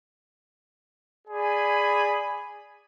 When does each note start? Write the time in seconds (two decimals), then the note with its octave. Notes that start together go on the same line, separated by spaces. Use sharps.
1.28 G#4 D5 G#5 B5